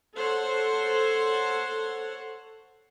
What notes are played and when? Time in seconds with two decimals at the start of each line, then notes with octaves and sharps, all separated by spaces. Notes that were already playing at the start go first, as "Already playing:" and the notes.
0.15 A4 C5 C#5 F#5